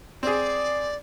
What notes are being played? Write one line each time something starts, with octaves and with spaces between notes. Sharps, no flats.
C4 G#4 D5